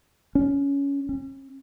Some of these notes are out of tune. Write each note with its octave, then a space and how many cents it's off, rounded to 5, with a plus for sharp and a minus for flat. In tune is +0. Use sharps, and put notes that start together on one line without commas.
C#4 +15
C#4 -40